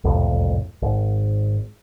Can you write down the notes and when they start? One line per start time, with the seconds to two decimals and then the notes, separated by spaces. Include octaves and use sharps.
0.04 F#1 C2 F2 A2
0.82 G#1